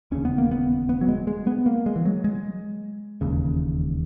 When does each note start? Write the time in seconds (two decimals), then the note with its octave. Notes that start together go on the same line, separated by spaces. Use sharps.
0.11 E1 D#2 C#3 C#4
0.25 B3
0.38 A#3
0.51 B3
0.89 B3
1.01 F#3
1.08 G#3
1.27 G#3
1.47 B3
1.66 A#3
1.86 G#3
1.96 E3
2.05 F#3
2.24 G#3
3.21 E1 D#2 C#3